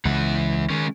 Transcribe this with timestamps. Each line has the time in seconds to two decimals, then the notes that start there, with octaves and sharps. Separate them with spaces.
0.05 C#2 E3 F#5
0.70 D#3 G#3 C#4